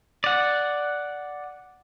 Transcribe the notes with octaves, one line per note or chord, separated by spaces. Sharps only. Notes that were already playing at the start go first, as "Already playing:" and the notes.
D5 F#5